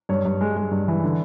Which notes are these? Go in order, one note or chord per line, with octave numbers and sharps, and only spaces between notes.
G2 C#5
G2
G#3
G#3
G2
E3
D3